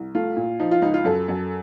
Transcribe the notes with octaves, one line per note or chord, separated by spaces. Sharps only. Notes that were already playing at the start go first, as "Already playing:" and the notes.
Already playing: C2
A3 F4
A#2
F3 D#4
F4
C#2 D#4
F4
F#2 A4
F#2